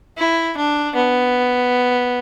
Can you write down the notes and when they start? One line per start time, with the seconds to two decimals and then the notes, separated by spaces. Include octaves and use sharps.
0.18 E4
0.57 D4
0.95 B3